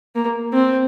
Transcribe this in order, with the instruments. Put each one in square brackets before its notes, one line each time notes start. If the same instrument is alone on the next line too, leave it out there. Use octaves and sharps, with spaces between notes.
[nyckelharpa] A#3
C4